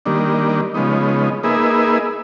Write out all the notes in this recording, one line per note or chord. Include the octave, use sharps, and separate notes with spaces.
D#3 G3 A#3 D4
C#3 F3 G#3 B3 D#4
A#3 D#4 G#4 B4 E5